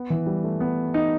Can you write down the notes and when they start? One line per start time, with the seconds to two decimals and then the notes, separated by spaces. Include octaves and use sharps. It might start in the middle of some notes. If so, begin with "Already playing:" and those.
Already playing: B3
0.10 E3
0.26 G3
0.44 A3
0.60 B3
0.94 D#4